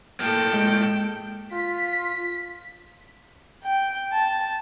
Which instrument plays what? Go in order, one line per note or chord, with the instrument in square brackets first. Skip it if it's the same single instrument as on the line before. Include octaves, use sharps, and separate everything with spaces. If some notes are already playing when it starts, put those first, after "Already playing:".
[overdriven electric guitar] A2 A#3 [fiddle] A4 [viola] G5
[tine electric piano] G#3
[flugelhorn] F4 [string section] B6
[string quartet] G5
A5